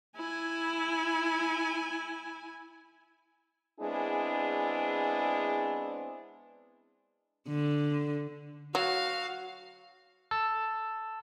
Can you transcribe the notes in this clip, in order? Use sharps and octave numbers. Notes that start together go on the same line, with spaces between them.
E4 G#5
G#3 B3 C4 D4 E4 G#4
D3
F#3 F#4 F5
A5 E6